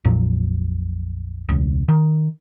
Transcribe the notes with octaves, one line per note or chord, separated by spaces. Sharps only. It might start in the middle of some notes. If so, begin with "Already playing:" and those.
A#1 F2 A#2 F#3
E1 C#2
D#3